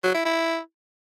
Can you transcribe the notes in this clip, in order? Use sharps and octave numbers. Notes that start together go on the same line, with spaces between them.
F#3
E4
E4